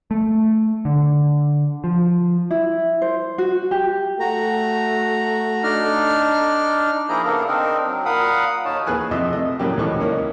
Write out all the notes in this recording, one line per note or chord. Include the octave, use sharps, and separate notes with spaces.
A3
D3
F3
E4
C5
F#4
G4
A3 F#4 A#5
D4 D#4 F6
F3 A#3 E4 G#4 A#5 G6
C#3 A#3 B3 D4 A4 A#4
C4 D4 D#4 A#4
F#3
A#2 A#4 F5 F#5 B5 D#6
D#2 D#4 C#5 A5
D#2 G#4 B4 G#5 F#6
F2 C3 F4 D#5 E5
A3 D#5
A2 C#3 F#3 A#3 G4
C#2 E3 D#4 A4 C#6
A#3 C#4 D#4 E4